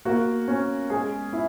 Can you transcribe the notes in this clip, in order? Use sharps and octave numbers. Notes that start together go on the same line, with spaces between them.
A#3 F#4
C#4
G#3 G#4
E4